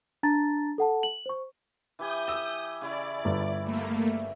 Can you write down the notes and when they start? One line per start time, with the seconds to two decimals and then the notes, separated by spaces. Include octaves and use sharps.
0.23 D4 A5 A#5 A6
0.78 A4 F#5 A5
1.03 F#7
1.26 C5 C#6
1.99 E3 G4 G#5 D#6 G6
2.28 E6
2.81 C#3 E4 D5 E5
3.25 G1
3.64 A3 A#3